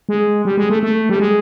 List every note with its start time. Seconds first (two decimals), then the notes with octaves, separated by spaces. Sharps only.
0.09 G#3
0.45 G3
0.57 G#3
0.70 A3
0.83 A3
1.09 G3
1.20 G#3